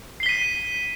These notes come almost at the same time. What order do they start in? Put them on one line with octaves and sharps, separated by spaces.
C7 G7 B6 D#7